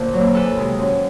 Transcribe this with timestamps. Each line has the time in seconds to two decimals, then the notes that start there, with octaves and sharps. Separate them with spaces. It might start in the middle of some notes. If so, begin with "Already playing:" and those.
Already playing: A#2 D3 A#4 C5
0.13 F#3 A#3
0.33 E2 A4 B4
0.57 C3 D#3 G#3
0.79 F#2